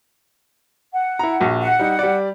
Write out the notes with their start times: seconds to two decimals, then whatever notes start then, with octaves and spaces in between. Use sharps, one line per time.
0.94 F#5
1.19 E4 A#5
1.40 A#1 F#4
1.61 F#5
1.79 G3 D#4
1.99 G3 D5